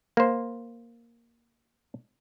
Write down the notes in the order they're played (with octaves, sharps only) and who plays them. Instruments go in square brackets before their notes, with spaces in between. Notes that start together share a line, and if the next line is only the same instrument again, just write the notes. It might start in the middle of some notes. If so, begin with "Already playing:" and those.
[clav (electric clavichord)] A#3 C5